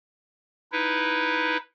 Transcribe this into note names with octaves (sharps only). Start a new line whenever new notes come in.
D#4 E4 B4